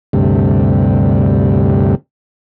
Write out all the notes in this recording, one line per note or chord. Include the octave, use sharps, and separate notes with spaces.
D2 G2 C3